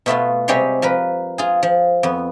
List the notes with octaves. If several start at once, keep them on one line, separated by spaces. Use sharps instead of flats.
B2 A3 B3 F4
C3 G3 G#3 G4 C#5 C6
F3 A#4 B4
F4 G#4
F3
F2 B3